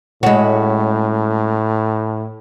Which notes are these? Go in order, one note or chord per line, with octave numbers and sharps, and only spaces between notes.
A2 G#3 C#4 F#4 B5